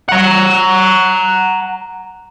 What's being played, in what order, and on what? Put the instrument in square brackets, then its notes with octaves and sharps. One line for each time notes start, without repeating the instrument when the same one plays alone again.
[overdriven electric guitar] F#5 A#5